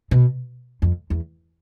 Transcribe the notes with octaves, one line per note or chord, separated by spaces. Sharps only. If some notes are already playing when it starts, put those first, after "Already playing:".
B2
F2
E2